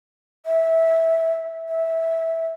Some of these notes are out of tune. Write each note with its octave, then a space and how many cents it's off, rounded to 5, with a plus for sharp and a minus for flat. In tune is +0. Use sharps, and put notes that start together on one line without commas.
E5 -15
E5 -15